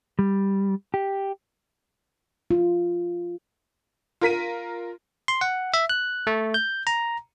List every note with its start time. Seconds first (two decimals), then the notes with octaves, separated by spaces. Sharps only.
0.19 G3
0.94 G4
2.51 F4
4.21 F4 A#4 B6 D#7
5.28 C6
5.41 F#5
5.74 E5
5.90 F#6
6.27 A3
6.54 G6
6.87 A#5